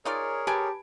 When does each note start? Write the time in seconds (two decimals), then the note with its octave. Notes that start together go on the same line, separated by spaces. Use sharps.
0.05 D#4 F4 G#4 A#4 C#5 D5
0.47 G4 B4 G#5 A5 D7